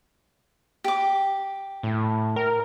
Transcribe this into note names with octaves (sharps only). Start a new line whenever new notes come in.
G4 D6
A2
A#4